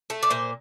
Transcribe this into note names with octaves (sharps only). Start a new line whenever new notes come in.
A3
D5
A#2 C5